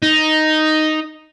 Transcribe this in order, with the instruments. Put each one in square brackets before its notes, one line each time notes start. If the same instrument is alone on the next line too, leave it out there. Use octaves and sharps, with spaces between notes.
[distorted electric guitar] D#4